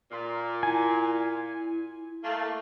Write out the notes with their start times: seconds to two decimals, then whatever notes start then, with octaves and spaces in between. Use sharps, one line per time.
0.11 A#2
0.63 E4 G#5
2.23 A3 A#3